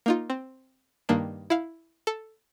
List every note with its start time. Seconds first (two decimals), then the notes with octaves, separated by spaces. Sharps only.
0.06 A#3 D#4 F4
0.30 C4
1.09 G2 D#3 A#3 D4
1.50 E4 F5
2.07 A4